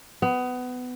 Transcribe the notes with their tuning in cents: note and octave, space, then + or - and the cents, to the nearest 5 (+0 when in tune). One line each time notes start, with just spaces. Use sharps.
B3 +20